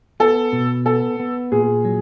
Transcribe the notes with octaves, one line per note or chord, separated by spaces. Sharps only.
B3 A4
B2
B3 A4
B3
A#2 G#4
F#3